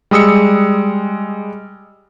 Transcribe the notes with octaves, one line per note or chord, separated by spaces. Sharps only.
G3 G#3 D#6 E6 C#7